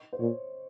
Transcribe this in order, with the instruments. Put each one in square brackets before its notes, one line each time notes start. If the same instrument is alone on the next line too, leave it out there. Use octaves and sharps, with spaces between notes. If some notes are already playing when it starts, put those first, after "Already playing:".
Already playing: [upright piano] D#5
C5
[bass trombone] A#2 [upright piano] C#5